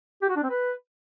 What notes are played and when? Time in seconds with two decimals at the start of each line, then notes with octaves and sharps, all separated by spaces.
0.22 G4
0.29 F#4
0.36 D4
0.43 C4
0.50 B4